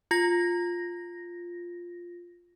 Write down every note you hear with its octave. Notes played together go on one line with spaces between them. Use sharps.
F4 A#6